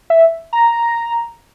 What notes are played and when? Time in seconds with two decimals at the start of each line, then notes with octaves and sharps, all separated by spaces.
0.10 E5
0.53 A#5